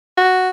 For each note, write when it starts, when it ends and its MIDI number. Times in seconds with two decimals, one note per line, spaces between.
0.17 0.49 66